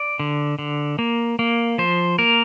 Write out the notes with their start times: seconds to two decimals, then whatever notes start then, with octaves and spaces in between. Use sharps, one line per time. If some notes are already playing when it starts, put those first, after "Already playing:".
Already playing: D5
0.20 D3
0.59 D3
0.99 A#3
1.39 A#3
1.78 F3 C5
2.19 A#3 A#4